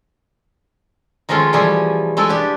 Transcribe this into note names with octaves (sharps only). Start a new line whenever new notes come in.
D#3 F3 G#3 A3 C#4 F4
B2 E3 F3 G3 A3 G#4
G#3 A3 E4 A4 B4
B3 D4 G4